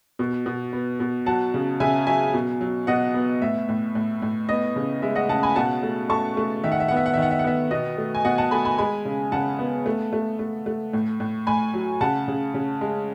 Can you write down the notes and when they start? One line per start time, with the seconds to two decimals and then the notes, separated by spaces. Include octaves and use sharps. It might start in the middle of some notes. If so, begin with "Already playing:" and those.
0.19 B2
0.46 B2
0.73 B3
1.00 B2
1.26 F#3 F#5 A5
1.54 C#3
1.80 C#3 E5 G#5
2.07 F#3 E5 G#5
2.34 B2
2.61 F#3
2.87 B2 D#5 F#5
3.14 B3
3.42 A2 E5
3.69 A2
3.95 A2
4.22 A2
4.49 B3 D#5
4.76 C#3
5.02 G#3 E5
5.15 D#5 F#5
5.29 C#3 F#5 A5
5.43 G#5 B5
5.56 B2 F#5 A5
5.83 A3
6.10 A3 A5 C#6
6.37 A3
6.64 D#3 E5
6.72 F#5
6.80 E5
6.88 B3 F#5
6.97 E5
7.06 F#5
7.14 E5
7.17 D#3
7.22 F#5
7.31 E5
7.39 F#5
7.44 B3 E5
7.71 B2 D#5
7.98 A3
8.15 G#5
8.25 B2 D#5 F#5
8.38 F#5 A5
8.51 A3 G#5 B5
8.65 G#5 B5
8.78 G#3 G#5 B5
9.05 C#3
9.32 C#3 F#5 A5
9.59 B3
9.86 A3
10.13 A3
10.39 A3
10.66 A3
10.93 A2
11.20 A2
11.47 A2 G#5 B5
11.74 F#3
12.01 C#3 F#5 A5
12.28 C#3
12.54 C#3
12.81 G#3